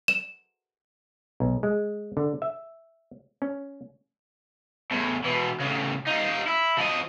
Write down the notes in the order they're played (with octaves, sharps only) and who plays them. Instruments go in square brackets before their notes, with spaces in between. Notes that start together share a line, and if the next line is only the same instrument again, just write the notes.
[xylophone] E7
[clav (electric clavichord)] B1
G#3
D3
E5
C#4
[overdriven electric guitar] E2 A2
B2 E3
A2 C#3
D#4 F4
E4
F3 D#5